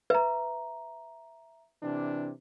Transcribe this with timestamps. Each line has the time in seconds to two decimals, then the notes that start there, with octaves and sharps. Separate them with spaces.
0.10 B4 E5 A#5
1.82 C3 E3 D4